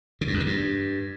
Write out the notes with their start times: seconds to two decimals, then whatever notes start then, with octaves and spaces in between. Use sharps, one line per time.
0.21 C#3
0.28 G2
0.34 F2
0.40 D3
0.46 G2